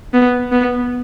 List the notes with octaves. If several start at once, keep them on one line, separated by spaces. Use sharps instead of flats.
B3
B3